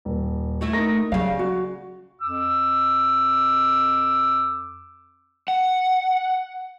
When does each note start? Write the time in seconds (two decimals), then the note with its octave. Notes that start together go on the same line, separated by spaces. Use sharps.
0.05 D#1
0.61 A3 E4 F#4
0.73 D#4 A#4 A#6
1.12 C#3 F#3 G3 F5
1.39 F#4
2.21 F2 D6 E6
5.48 F#5